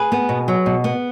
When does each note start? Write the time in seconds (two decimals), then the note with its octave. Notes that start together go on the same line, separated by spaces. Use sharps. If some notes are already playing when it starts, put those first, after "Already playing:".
Already playing: G#4 B4
0.12 B3
0.29 B2
0.48 F#3
0.66 B2
0.84 B3